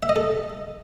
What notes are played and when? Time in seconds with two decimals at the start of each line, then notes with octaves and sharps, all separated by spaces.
0.03 E5
0.09 D#5
0.16 A4